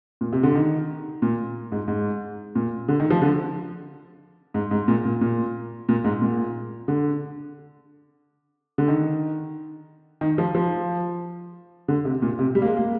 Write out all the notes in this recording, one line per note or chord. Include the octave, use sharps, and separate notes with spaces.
A#2
C3
D3
D#3
A#2
G#2
G#2
A#2
D3
D#3
F3
D3
G#2
G#2
A#2
A#2
A#2
A#2
G#2
A#2
D3
D3
D#3
D#3
F3
F3
D3
C3
A#2
C3
G3
A#3
G#3
A#3